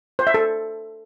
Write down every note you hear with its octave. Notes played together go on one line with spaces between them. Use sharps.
C5
E5
A4